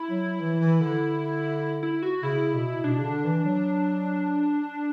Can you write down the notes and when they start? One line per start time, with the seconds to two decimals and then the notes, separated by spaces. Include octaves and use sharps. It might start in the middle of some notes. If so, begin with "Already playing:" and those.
Already playing: E4
0.10 F#3
0.40 E3
0.60 E3
0.81 D3
1.83 E4
2.02 F#4
2.23 C#3 E4
2.53 B2
2.84 B2 D4
2.98 C#3
3.04 D3
3.24 E3
3.45 F#3